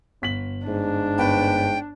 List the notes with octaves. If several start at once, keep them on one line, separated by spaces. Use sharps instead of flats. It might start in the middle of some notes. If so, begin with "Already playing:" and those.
G1 B6 F#7
G#2 D4
G1 B4 G5